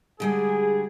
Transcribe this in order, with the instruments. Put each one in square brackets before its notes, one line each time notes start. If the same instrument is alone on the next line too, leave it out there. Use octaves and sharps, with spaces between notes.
[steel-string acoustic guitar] D3 G3 G#3 [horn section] G#4